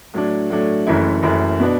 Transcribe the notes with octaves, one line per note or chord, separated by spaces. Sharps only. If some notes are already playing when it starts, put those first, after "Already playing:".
A2 F#3 A3 D4
A2 F#3 A3 D4
F#1 F#2 E3 A3 E4
F#1 F#2 E3 A3 E4
B2 B3 D4